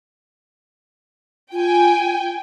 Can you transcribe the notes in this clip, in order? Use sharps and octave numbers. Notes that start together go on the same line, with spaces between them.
F4 G5 G#5